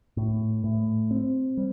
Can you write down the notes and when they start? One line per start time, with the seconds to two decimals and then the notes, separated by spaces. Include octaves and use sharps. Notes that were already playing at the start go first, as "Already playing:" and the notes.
0.17 A2
0.64 A2
1.11 C4
1.57 G3